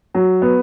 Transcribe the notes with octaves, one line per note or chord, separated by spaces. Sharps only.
F#3
B3